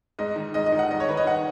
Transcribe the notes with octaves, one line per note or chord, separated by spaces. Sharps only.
G#2 D#5
D#3
G#2 D#5
D#5
D#3
F#5
G#2 D#5
C#5
D#3 B4
D#5
F#5